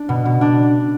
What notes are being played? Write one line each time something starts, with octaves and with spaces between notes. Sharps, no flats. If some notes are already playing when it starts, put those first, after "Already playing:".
Already playing: D4
B2
B2
D4